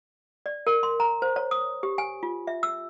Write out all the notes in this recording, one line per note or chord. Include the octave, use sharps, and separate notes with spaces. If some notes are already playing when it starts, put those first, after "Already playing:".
D5
A#4
C6
A#5
C5
C#5
D#6
G4
G#5
F4
E5
E6